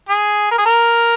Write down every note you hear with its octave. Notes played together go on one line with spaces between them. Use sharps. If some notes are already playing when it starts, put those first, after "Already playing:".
G#4
A#4
G#4
A#4